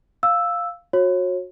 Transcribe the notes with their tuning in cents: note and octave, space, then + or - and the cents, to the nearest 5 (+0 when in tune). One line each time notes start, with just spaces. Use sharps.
F5 +0 E6 +0
F#4 -25 C#5 -30